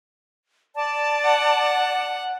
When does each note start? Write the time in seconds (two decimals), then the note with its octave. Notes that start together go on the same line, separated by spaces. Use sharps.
0.75 D5 A5
1.25 F#5